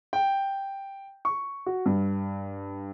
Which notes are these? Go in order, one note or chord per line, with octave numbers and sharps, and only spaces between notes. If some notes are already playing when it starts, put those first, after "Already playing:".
G5
C#6
F#4
G2